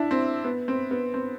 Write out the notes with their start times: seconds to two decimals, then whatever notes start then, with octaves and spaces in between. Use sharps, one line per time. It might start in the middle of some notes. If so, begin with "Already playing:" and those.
Already playing: D4 E4
0.11 C4
0.44 B3
0.68 C4
0.91 B3
1.14 C4